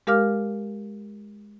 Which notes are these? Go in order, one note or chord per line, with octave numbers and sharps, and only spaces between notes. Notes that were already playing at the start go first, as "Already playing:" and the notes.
G#3 G4 A#4 F5 D6 F6